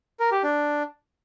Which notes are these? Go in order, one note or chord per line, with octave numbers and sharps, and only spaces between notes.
A#4
G4
D4